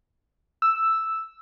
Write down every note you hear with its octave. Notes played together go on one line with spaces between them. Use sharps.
E6